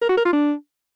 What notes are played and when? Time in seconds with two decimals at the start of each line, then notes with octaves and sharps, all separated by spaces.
0.02 A#4
0.09 F#4
0.17 A#4
0.25 F4
0.33 D4